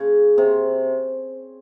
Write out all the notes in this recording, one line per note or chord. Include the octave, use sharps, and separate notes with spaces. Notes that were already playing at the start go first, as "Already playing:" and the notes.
Already playing: C#3
C3